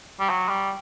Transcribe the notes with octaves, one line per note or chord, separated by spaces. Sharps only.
G3
F#3
G3